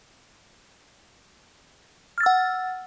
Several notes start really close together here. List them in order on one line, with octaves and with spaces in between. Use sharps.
F6 A6 E6 F#5